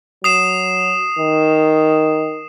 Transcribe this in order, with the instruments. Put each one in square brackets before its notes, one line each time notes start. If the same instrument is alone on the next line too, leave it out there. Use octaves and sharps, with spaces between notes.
[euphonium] F#3 [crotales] D#6 C7 E7
[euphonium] D#3